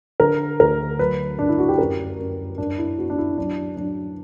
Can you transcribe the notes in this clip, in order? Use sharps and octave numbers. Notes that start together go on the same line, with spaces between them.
D3 A#4
D2 A#4
F#3 B4
G2 D4
E4
F#4
G4
F#2 A#4
F#2
G2 D4
E4
B3 F#4
D4
E4
F#3 D4
F#3 D4